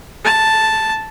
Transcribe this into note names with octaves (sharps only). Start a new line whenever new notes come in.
A5